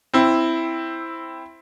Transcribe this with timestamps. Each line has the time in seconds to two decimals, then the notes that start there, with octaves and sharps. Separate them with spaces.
0.14 C4 E4